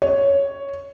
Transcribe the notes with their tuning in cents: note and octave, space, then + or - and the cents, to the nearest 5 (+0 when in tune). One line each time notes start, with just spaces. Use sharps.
C#5 +5